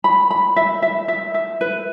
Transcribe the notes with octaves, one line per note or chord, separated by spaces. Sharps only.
B5
B5
E5
E5
E5
E5
B4